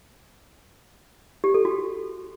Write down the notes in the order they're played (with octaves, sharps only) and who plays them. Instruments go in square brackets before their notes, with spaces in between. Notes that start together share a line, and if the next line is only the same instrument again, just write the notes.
[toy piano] G4
A4
F#4